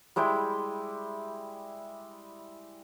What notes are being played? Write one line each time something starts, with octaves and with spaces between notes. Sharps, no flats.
G3 G#3 E4 G5